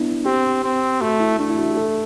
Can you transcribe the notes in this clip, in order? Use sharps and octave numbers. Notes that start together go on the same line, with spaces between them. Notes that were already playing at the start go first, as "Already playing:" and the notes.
Already playing: B3 D4 E4
C4 G4
C4
A3 F#4
E4
A3 D4
E4
F#4
G4
A4